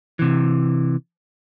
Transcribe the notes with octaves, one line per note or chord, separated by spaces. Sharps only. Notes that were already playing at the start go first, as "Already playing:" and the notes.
C3 E3